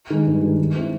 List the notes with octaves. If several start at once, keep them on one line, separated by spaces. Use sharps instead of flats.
D#3 G#3
G2
D#3 G#3
D#3
G#3 C4 E4